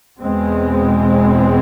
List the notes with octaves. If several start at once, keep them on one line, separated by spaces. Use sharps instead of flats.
E2 B2 G#3 C4